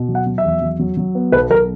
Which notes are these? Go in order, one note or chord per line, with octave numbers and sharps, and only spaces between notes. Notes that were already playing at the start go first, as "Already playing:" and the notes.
Already playing: B2
F#3
F#5
F#3
E5
E2
F#3
F#3
F#3
B3
B1 B4
B1 A#4